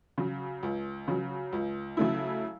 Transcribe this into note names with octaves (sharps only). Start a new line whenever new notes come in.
C#3 F#3
C#2
C#3 F#3
C#2
C#3 F#3 A3 E4